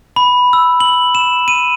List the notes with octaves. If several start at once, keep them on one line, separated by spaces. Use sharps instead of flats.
B5
E6
F#7
E7
D#7